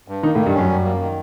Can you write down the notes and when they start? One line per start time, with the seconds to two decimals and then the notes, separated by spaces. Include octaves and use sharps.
0.08 G2
0.23 D#3 A#3 D#4
0.35 A2 A3
0.39 D#3
0.46 G2 G3
0.54 F#2 F#3 C#4
0.70 G3
0.85 A#3
1.00 D#3